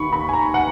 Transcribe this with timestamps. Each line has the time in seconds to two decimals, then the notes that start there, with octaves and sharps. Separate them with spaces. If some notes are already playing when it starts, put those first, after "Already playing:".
Already playing: D#2 D#3 B5 C#6
0.13 D#2 B5
0.29 G#5
0.33 A#5
0.54 F#5